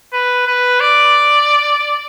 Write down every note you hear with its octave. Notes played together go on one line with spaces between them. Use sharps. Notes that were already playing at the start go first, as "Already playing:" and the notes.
B4
B4
D5